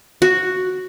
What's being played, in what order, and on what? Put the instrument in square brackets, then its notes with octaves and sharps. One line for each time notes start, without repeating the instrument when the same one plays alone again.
[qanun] F#4